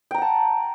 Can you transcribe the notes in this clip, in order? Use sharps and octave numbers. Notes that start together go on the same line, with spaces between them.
F#5 G5 A5 A#5